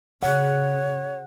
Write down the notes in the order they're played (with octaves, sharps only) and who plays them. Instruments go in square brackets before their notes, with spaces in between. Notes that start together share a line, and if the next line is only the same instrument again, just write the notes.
[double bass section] C#3 [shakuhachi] C#5 [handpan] F#5